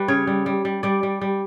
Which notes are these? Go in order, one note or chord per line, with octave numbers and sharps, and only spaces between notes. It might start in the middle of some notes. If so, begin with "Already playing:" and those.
Already playing: G3 B4
C#3 C#5
G3
G3
G3
G3 D5
G3
G3